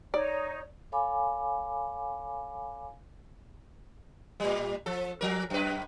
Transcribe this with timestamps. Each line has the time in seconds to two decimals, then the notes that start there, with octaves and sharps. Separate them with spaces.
0.14 D#4 C#5 D5
0.92 A4 C#5 F5 G#5 B5 D6
4.40 A2 G3
4.86 F3 A4
5.21 F3 A#4
5.50 F#2 B4